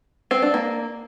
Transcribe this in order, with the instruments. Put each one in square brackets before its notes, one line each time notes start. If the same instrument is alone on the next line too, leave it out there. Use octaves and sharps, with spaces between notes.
[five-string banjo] C4
D4
A#3